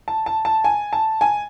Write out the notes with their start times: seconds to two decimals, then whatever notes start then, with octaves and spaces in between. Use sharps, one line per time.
0.08 A5
0.26 A5
0.45 A5
0.64 G#5
0.93 A5
1.21 G#5